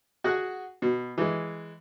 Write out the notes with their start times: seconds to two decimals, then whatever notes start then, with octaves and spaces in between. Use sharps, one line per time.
0.24 F#4 G#4 F#5
0.82 B2
1.18 E3 G#3